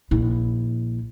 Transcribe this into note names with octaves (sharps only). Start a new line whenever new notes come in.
A#1 E4